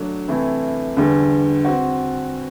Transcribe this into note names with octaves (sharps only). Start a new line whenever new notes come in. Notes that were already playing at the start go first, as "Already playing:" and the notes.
Already playing: F#3 A3 D4
C3 E3 A3 E4
E2 D3 G3
C4 F#4